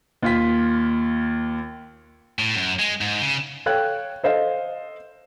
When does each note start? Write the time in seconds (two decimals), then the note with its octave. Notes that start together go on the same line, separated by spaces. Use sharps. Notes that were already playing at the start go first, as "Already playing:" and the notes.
0.22 D#2 F4 B6
2.39 A2
2.56 F#2
2.79 G#3
3.01 G#2
3.22 C#3
3.66 A4 C#5 F5 G5 F#6 G#6
4.24 A4 C5 D#5 F5